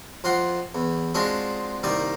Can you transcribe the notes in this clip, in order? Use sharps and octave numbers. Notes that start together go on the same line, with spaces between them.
F2 F4 F#5 C6
E2
G#3 C4 D4 F4 F#4
C2 D#3 G3 A#3 D5